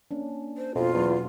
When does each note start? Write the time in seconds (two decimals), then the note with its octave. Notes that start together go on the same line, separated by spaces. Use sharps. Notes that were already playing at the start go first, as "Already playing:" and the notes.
0.11 A#3 C#4 D4
0.57 C5
0.75 F2 B2 B3 F4 F#4
0.94 E2 F#3 C#4